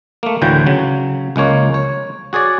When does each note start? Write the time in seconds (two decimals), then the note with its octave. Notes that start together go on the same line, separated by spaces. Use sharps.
0.23 A3 A#3
0.42 D2 A2 D3 E3 F#4 G5
0.66 C#3 F#3
1.36 C#2 G#3 A#3 C#5
1.74 C#5
2.33 F#4 G#4 C#5 D5